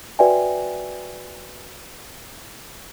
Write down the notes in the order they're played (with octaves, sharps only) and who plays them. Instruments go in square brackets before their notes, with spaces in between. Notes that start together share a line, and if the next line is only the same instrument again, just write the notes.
[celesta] F#4 B4 D5 E5 G5 G#5